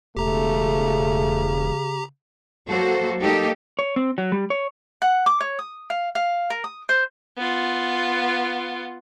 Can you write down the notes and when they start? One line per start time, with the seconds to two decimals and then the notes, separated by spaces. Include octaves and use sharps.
0.17 E1 C#3 A3 G4 A#5
2.68 F#3 A#3 F#4 A4 C5
3.21 G3 A#3 D#4 G4 A4
3.79 C#5
3.96 C4
4.18 F#3
4.32 G3
4.50 C#5
5.02 F#5
5.26 D6
5.41 C#5
5.59 D#6
5.90 F5
6.15 F5
6.50 A#4
6.64 D#6
6.89 C5
7.38 B3 F4